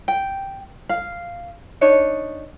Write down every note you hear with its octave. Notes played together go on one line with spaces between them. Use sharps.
G5
F5
D4 D#4 C#5